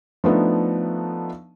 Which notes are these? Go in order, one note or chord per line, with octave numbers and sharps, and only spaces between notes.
F3 A3 B3 D4 D#4